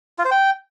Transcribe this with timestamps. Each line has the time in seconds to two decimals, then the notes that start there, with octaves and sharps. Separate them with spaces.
0.19 F4
0.25 C5
0.31 G5